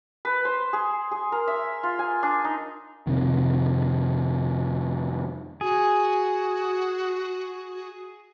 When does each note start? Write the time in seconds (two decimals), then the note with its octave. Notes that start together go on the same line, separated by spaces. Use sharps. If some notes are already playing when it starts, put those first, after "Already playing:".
0.25 B4
0.45 C5
0.73 G#4
1.11 G#4
1.32 A#4
1.48 E5
1.83 F4
1.99 G#5
2.23 D4
2.45 D#4
3.07 F2 C3 D#3
5.61 F#4 G#4